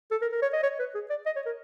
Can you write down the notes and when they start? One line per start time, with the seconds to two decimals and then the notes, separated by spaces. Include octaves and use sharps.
0.11 A4
0.22 A#4
0.32 A#4
0.42 C#5
0.53 D#5
0.63 C#5
0.79 B4
0.94 G#4
1.10 D5
1.26 D#5
1.36 C#5
1.46 A#4